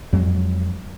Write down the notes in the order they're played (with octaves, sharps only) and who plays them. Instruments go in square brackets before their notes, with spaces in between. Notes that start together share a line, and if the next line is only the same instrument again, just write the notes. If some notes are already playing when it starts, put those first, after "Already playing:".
[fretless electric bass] F2 F#3 G#3